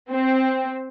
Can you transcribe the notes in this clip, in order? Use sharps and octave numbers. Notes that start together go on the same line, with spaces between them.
C4